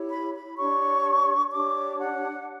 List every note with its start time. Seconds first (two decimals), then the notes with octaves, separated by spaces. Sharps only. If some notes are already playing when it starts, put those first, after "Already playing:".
Already playing: E4 G4 C#5
0.10 B5
0.34 B5
0.57 D4 G4 C#5 C#6
1.52 D4 G4 C#5 D6
2.00 F#5